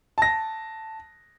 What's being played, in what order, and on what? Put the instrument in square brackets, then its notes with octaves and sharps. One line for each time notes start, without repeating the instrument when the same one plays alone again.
[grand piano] A5 A#6